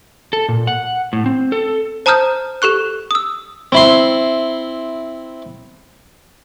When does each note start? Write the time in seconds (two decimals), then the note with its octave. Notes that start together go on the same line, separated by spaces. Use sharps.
0.33 A4
0.49 A#2
0.67 F#5
1.13 A2
1.26 C4
1.52 A4
2.06 C5 A5 A#5 D#6 F6 G6
2.62 G4 A4 C#6 F#6
3.11 D#6 E6
3.72 C4 E4 C6